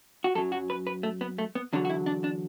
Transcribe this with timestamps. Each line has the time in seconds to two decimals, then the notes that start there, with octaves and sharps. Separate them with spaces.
0.24 F#4
0.35 F#2 F#3 A4
0.52 F#4
0.70 B4
0.87 B4
1.03 A3
1.21 B3
1.38 A3
1.55 B3
1.73 E2 D3 F#3 D4
1.85 F#4
1.90 E4
2.06 D4
2.24 D4